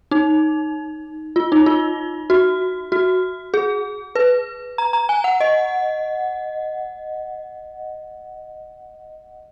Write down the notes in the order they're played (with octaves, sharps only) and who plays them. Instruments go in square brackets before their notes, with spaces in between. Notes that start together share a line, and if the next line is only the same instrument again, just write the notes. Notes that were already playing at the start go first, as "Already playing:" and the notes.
[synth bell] D#4
F4
D#4
F4
F#4
F#4
G#4
B4
A#5
A#5
G#5
F#5
D#5